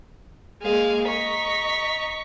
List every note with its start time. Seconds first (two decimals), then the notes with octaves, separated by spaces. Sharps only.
0.62 G#3 A#3 G#4 F5
1.08 D#5 A#5 C#6 B6